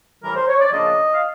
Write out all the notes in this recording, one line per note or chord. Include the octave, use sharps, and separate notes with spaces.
A2 E3 G3 A#4
C5
C#5
D5
C#3 F3 A#3 D4 D#5
F5